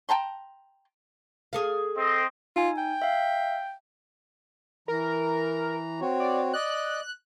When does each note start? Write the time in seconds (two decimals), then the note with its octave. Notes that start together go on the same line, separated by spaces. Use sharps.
0.09 G5 A5 A#5 C6
1.53 G#4 A4 F5
1.98 C4 D#5
2.56 D#4 F4 G#5
2.78 G5
3.02 E5 F5
4.88 E3 A#4 A#5
6.01 C4 F#4 C#5
6.20 D5
6.53 D5 D#5 F#6